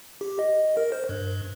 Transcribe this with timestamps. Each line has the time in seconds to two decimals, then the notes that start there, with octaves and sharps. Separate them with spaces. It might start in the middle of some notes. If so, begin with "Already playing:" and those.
0.21 G4
0.39 D#5
0.77 A#4
0.92 C5
1.09 G2